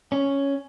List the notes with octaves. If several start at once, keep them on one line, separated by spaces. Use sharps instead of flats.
C#4